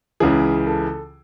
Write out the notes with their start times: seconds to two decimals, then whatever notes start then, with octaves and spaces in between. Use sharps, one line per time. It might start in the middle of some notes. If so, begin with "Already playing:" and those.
0.20 C#2 C#3 E3 G#4
0.67 A4